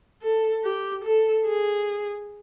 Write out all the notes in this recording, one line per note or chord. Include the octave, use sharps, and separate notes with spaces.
A4
G4
A4
G#4